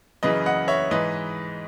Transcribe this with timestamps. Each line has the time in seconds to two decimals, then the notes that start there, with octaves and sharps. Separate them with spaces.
0.23 F#2 C#3 E3 B4 D#5
0.46 D#5 F#5
0.68 C#5 E5
0.90 G#2 E3 B4 D#5